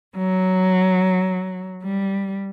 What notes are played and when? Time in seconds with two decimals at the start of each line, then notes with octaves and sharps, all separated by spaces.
0.16 F#3
1.83 G3